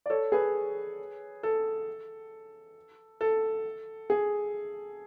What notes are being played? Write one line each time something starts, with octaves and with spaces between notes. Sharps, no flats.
D5
A4 C#5
G#4 B4
A4
A4
G#4